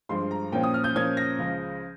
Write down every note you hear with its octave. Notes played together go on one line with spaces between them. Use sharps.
G2 F3 G#3 C6
A#5
A#2 F3 A#3 C#4 G5
D#6
F6
G6
A#2 F3 A#3 C#4 G#6
A#6
C#2 C#3 F3